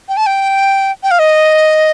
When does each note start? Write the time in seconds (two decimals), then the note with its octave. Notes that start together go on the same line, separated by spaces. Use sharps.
0.09 G5
0.17 A5
0.26 G5
1.03 G5
1.11 F5
1.19 D#5